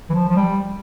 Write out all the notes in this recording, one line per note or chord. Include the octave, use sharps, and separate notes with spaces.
E3
F3
F3
G3